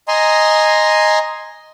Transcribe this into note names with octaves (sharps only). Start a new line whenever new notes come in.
D#5 G#5 A#5 C6